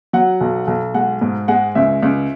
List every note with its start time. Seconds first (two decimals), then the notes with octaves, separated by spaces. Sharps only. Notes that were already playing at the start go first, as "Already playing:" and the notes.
0.13 F#3 F#5
0.41 B1
0.67 B1
0.94 G#3 F#5
1.21 G#2
1.48 G#3 F#5
1.75 C#2 E5
2.03 C#2